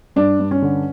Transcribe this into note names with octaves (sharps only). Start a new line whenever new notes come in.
G2 D4
G2
C#4
D3